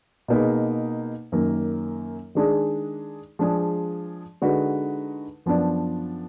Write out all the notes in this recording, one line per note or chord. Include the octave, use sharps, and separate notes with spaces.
B2 A#3 D#4 G#4 B4
F#2 D#3 A#3
D#3 G#3 D4 G#4
F3 G#3 D4 G#4
D3 G#3 D#4 F#4 B4
F#2 F3 B3 D4